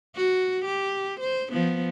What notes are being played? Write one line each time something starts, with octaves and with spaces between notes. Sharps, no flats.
F#4
G4
C5
F3 B3